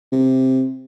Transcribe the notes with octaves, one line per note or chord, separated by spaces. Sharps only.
C3